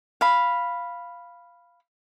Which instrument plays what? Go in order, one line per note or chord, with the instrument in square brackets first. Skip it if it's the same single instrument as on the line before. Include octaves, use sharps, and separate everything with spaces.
[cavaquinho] F5 B5